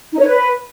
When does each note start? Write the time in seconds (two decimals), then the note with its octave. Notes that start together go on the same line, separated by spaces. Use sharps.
0.12 D#4
0.19 C#5
0.27 B4